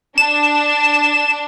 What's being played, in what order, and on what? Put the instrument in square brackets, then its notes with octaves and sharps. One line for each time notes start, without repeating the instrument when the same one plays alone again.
[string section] D4 [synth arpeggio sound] E7